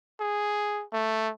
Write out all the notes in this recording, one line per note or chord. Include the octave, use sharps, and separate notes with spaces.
G#4
A3